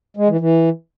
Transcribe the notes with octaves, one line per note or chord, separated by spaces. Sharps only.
G#3
E3
E3